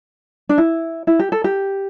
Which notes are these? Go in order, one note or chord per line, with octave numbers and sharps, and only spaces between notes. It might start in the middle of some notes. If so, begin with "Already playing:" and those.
D4
E4
E4
G4
A4
G4